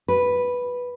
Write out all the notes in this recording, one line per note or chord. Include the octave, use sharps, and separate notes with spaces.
B4